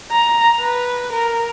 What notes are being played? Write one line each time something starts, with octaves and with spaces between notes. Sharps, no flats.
A#5
B4
A#4